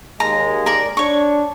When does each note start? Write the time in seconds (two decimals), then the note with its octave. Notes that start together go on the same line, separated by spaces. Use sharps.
0.20 D#2 G#3 A#5
0.66 A#4 D5
0.97 D4 C#5 C#6